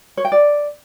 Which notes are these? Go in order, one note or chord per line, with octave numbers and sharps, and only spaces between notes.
C#5
G5
D5